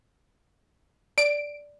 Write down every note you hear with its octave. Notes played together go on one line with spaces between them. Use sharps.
D5 D7